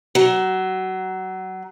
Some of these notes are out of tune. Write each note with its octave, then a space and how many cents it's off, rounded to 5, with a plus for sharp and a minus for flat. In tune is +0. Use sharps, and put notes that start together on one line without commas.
F#3 +20